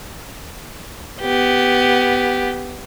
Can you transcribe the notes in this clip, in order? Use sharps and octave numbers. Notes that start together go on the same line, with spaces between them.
B3 G4